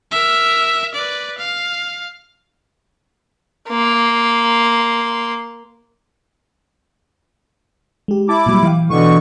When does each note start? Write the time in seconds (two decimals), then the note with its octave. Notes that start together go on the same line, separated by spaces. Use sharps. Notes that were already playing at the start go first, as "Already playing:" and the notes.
0.12 A#4 E5
0.95 B4 D5
1.38 F5
3.69 A#3 C6
8.08 G#3 G4
8.29 E4 A5 D6
8.46 A#2 F#3 G3
8.63 E3 F5 G5
8.90 B2 D3 E3 C#6